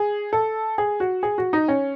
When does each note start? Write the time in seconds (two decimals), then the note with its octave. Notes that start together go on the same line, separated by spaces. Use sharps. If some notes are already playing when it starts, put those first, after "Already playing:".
Already playing: G#4
0.33 A4
0.78 G#4
1.00 F#4
1.23 G#4
1.38 F#4
1.53 D#4
1.68 C#4